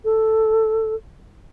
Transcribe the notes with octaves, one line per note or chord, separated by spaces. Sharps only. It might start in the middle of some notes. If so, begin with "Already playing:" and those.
A4